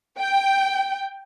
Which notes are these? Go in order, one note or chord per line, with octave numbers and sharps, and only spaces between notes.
G5